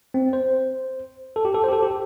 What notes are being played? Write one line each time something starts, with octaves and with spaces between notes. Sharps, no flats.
C4
C5
A4
G4
A4
C5
G4
A4
G4